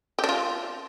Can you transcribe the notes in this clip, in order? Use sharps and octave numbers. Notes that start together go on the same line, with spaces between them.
G4
D4
F4